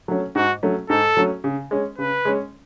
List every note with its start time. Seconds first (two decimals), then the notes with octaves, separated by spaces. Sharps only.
0.08 F#3 A3 C#4
0.35 G#2 F#4
0.63 F#3 A3 C#4
0.90 G#2 A4
1.17 F#3 A3 C#4
1.44 C#3
1.71 G#3 C#4
1.98 C#3 B4
2.25 G#3 C#4